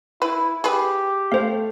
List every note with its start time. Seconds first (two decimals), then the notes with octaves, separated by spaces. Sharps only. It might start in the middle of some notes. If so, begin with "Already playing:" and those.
0.22 E4 B4
0.64 G4 G#4 B4
1.32 A3 C5 F5